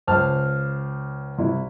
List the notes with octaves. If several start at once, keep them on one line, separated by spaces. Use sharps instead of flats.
C#2 C5 A5 F6
C2 E4